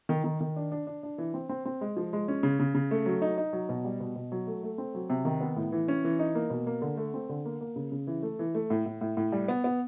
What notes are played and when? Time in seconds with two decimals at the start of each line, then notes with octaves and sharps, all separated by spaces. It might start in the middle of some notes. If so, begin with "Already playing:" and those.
0.09 D#3
0.24 D#3
0.41 D#3
0.56 D4
0.72 D4
0.87 D4
1.03 D4
1.18 E3
1.34 C4
1.49 C4
1.65 C4
1.81 G#3
1.97 F3
2.13 G#3
2.28 C#4
2.43 C#3
2.60 C#3
2.75 C#3
2.91 A3
3.06 F#3
3.22 D#4
3.38 D#4
3.53 F#3
3.69 B2
3.85 G3
4.00 B2
4.16 B2
4.32 F#3
4.47 A3
4.63 A3
4.78 C4
4.95 F#3
5.10 C3
5.25 D#3
5.41 B3
5.56 A2
5.72 E3
5.88 C#4
6.04 E3
6.19 D#4
6.35 A#3
6.50 B2
6.67 A#3
6.82 D3
6.97 A3
7.14 C4
7.29 D3
7.45 A#3
7.61 A#3
7.76 C#3
7.92 C#3
8.07 E3
8.23 A3
8.39 E3
8.55 A3
8.70 A2
8.86 A2
9.01 A2
9.17 A2
9.32 G3
9.48 B3
9.64 B3